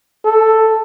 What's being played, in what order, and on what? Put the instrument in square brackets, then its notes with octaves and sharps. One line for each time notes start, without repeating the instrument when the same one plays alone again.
[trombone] A4